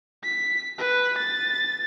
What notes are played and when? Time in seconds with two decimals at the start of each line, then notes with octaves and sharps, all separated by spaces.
0.24 B6
0.78 B4
1.18 A6